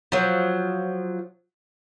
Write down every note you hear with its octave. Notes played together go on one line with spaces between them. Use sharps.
F3 F#3